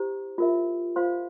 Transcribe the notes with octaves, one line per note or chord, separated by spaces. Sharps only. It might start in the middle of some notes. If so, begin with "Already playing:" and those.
Already playing: E4 G4 C5
F4 A#4 E5
F4 C5 F5 C6